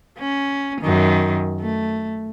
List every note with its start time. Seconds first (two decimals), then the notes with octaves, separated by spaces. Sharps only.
0.18 C#4
0.81 F#2 D#3
1.61 A3